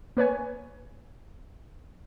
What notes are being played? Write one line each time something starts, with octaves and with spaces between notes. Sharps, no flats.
A#3 B4 C#5 G#5